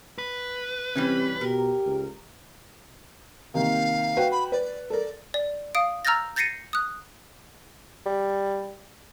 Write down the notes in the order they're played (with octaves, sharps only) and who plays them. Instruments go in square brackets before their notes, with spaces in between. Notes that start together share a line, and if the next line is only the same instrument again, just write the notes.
[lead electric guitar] B4
[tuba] C3 [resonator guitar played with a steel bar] E3 G3 C#4
[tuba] B2 [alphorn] G4 [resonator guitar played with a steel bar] A#4
[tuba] C#2
[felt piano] C3 D#3 A#3 [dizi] F5
[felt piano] F#4 B4 G5
[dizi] B5
[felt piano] B4 [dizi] D5
[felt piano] A4 A#4 [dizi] D5
[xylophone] D5
F5 D#6 D7
A#5 E6 F6 G6 A6 A#6
G6 A6 A#6 C7 C#7 D#7
D#6 F#6
[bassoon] G3